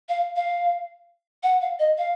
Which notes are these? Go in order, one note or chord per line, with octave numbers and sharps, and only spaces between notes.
F5
F5
F#5
F5
D#5
F5